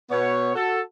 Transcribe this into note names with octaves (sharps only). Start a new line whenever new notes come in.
B2 B3 C#5
F#4 A4